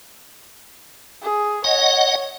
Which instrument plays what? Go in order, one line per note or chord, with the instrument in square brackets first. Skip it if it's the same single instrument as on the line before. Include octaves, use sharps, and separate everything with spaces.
[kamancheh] G#4
[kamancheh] C#5 [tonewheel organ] D#5 F#5